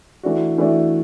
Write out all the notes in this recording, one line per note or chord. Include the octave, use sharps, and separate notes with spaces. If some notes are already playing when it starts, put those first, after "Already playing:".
E3 A3 D4 F#4
E3 A3 D4 F#4